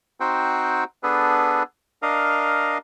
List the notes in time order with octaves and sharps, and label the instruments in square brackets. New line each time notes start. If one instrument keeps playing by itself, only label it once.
[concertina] C4 D#4 F#4 C5 F#5 G5
B3 D4 G#4 A4 B4
D4 A#4 D#5 F5